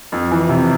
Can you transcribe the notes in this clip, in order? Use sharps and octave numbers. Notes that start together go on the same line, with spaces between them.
F2
E3
C3